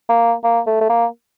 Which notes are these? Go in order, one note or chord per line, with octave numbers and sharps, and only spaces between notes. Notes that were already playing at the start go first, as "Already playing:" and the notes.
A#3
A#3
A3
A3
A#3